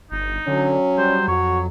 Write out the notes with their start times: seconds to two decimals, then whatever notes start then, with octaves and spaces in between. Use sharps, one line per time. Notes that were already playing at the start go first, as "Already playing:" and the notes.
0.12 G1 D#4
0.47 D3 F#3 C#4
0.98 G3 C5
1.28 F2 F#4 C#5